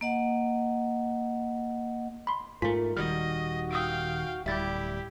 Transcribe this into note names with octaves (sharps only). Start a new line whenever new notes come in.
A#3 D#5 F#5
B5 C6
G#2 A3 F4 A#4 G#5 B6
D#1 D#3 G3 F#4 D#5 F6
F5 G5 D#6 E6 D7
D1 G3 E4 G4 E5 A6